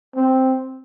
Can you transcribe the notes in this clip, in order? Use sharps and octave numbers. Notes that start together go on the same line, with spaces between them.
C4